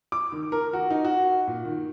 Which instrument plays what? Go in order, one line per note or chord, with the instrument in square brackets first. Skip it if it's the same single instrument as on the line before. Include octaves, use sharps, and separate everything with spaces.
[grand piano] D6
D#3
A#4
F#4
D#4
F#4
A#2
D#3